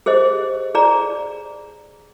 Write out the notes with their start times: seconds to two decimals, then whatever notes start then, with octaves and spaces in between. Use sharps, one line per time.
0.06 G4 G#4 C5 D#5
0.75 G#4 D5 A#5